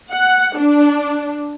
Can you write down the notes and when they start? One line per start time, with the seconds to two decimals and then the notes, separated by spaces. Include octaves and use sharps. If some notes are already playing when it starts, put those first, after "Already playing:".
0.12 F#5
0.57 D4